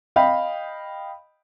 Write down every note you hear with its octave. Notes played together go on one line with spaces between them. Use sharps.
D#5 F5 G5 B5